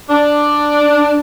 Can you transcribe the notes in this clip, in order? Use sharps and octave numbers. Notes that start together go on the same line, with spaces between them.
D4